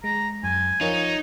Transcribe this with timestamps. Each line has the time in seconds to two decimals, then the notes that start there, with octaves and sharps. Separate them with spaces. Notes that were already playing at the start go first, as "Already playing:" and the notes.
0.04 G#3 A#5
0.44 F#2 G#5
0.81 F3 D#4 F4 A#4 C#5